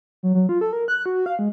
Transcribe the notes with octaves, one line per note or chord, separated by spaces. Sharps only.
F#3
F#3
F4
A4
A#4
F#6
F#4
F5
G#3